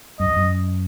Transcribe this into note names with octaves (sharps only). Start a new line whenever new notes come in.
F#2 D#5
E2
F#2